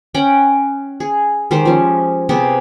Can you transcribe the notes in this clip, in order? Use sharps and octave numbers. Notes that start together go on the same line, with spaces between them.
C#4 F#5 G5
G#4
D#3 G#3 G4 C5
F3 C#4
C3 B3 G4 G#4